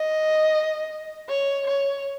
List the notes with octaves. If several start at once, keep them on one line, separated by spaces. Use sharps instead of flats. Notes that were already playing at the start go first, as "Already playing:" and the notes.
Already playing: D#5
C#5
C#5